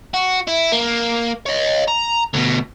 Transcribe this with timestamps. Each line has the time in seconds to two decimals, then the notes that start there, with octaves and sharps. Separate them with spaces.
0.14 F#4
0.48 E4
0.72 A#3
1.46 C#5 D#5
1.88 A#5
2.34 D2 B2